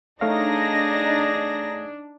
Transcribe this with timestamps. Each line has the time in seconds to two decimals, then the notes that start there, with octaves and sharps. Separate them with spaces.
0.21 A3 D4 D#4 G#4 C#5 F5 A#6